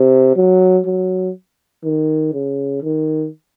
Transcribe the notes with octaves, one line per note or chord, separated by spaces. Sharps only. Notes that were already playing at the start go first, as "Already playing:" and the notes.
Already playing: C3
F#3
F#3
D#3
C#3
D#3